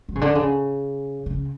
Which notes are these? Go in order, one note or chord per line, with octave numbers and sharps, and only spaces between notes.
F#3
C#3
D3
C#3
C#3